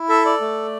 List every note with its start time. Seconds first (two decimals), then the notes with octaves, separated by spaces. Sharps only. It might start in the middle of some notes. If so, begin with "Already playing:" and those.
Already playing: E4
0.09 A4 E5
0.25 D5
0.41 A3